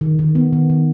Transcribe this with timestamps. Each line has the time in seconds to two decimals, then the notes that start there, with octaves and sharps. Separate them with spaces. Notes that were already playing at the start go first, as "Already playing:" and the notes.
0.01 D#3
0.19 D#3
0.35 B3
0.53 D#3
0.70 D#3